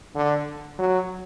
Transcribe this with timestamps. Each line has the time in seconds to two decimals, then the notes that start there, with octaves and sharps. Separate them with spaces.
0.15 D3
0.79 F#3